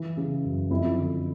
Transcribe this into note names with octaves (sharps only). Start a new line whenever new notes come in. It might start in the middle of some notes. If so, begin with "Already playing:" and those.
Already playing: E3
C#3
F#2
F2 E4
D3